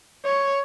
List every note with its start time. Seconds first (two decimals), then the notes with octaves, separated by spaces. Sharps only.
0.25 C#5